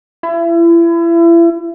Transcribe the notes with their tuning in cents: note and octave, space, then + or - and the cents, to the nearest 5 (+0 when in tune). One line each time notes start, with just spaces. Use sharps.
E4 +35